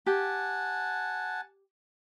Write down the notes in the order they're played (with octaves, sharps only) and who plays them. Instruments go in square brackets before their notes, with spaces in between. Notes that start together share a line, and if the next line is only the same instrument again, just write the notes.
[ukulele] G4 [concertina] F#5 G#5 A5